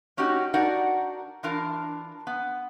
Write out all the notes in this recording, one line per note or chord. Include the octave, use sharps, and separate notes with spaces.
A#3 C#4 D#4 F#4 G4
D4 D#4 F#4 A#4 D5 F#5
E3 D4 F4 A#4
B3